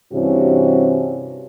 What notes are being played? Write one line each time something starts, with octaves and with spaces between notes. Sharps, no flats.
G2 C3 E3 C#4 F#4